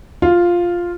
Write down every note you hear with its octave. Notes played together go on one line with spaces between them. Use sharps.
F4